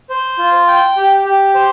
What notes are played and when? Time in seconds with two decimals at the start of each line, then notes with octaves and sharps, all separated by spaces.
0.10 C5
0.38 F4
0.67 G5
0.97 G4
1.25 G4
1.55 C5